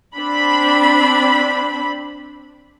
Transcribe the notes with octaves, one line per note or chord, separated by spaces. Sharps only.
C4 D4 B5